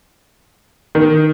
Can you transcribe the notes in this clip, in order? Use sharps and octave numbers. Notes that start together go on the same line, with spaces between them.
D#3